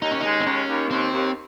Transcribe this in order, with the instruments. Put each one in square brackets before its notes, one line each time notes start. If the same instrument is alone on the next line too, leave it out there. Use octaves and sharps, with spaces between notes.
[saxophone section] D#2 [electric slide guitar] D#4
[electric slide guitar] C#4
[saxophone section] G#3 [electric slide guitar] D#4
[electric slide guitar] C4
[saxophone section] D#2 [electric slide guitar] C#4
[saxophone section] D#2
[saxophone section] D#2 [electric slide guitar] C4
[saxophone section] D#2